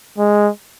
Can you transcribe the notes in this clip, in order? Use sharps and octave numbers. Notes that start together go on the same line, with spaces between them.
G#3